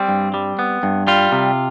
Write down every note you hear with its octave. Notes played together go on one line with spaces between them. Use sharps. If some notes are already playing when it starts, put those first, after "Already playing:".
Already playing: G3 C4
G2
G3
B3
G2
G3 F4
C3